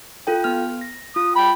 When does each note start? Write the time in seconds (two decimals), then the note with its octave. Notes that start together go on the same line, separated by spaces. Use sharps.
0.27 F4 A4 G5
0.44 B3 F6
0.81 A#6
1.16 F4 D#6
1.36 G5 B5